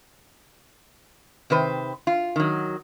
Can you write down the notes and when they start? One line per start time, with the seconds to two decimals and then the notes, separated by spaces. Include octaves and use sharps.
1.50 C3 D#3 B4 C5
2.07 F4
2.36 D#3 F#3